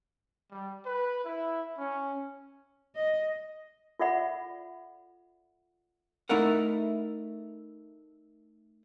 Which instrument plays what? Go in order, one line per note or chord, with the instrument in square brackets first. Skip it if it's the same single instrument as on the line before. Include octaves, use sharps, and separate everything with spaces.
[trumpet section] G3
B4
E4
C#4
[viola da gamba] D#5
[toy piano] F4 A4 D5 E5 F#5 B5
[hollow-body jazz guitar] A3 D#4 E4 A#4 F#5